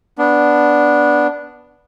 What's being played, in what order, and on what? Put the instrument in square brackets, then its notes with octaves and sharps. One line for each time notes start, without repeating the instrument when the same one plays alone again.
[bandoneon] B3 D4